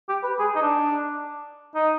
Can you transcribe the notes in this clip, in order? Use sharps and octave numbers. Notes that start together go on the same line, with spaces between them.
G4
B4
G#4
D#4
D4
D#4